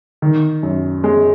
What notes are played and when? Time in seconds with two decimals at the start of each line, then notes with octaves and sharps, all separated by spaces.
0.22 D#3
0.63 F#2
1.04 G#3